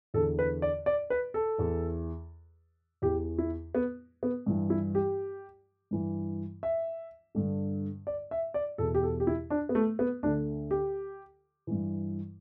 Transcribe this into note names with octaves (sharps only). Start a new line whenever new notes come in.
E2 D3 A4
B4
D5
D5
B4
A4
E2 E3
E2 E3 G4
E4
B3
B3
G2 E3
E4
G4
G2 E3
E5
G2 D3
D5
E5
D5
E2 B2 A4
G4
A4
G4
E4
D4
B3
A3
B3
D2 D3 D4
G4
G2 E3